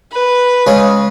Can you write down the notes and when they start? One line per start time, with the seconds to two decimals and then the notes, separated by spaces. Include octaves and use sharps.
0.12 B4
0.66 C#3 G#3 C#4